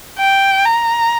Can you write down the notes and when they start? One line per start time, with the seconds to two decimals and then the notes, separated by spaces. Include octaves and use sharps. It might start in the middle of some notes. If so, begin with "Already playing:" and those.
0.19 G5
0.65 A#5